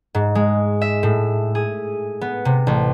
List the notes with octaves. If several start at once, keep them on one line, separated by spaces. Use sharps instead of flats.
G#2
G#3
E5
A2
G#4
B3
C3
A1